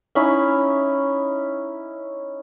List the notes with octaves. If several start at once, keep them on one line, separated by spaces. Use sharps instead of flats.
C#4 D#4 E4 B5